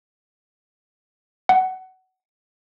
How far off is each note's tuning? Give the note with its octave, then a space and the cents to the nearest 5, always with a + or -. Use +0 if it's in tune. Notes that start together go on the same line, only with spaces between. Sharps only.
F#5 +20